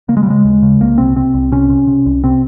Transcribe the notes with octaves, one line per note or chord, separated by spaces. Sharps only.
C#3 A#3
G#3
G3
C#3 G#3
D#2
C#3
C2 A#3
C3 C4
C3 C4
C2
C3 C#4
C3
C3
C2
C3 C4